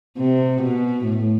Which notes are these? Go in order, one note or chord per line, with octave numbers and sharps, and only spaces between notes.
C3
B2
A2